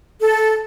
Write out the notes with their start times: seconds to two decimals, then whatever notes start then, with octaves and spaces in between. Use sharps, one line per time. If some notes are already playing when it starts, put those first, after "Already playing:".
0.20 A4